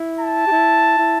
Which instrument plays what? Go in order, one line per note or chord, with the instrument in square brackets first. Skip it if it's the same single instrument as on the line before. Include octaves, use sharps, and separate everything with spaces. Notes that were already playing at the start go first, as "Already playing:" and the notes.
Already playing: [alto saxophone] E4
[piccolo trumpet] A5
[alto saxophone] G4
E4
E4